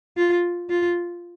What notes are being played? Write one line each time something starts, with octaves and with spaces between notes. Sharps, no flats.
F4
F4